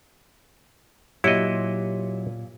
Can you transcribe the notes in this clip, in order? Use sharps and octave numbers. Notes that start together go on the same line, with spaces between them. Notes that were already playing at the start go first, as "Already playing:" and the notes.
A#2 F#3 E4 G4 C#5 D#5 C#7